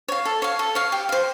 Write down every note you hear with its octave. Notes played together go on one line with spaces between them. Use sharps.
C#5 F5
A4
C#5 F5
A4
C#5 F5
G4
C5 F5